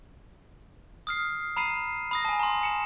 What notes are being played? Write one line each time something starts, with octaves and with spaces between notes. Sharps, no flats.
D#6 F6 C7
A#5 B5 C7 D#7
B5 D#6 A#6
G#5 A5
A#5 C6
C#7 E7